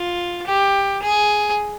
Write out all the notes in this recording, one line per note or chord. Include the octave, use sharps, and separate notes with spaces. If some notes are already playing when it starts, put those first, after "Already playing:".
Already playing: F4
G4
G#4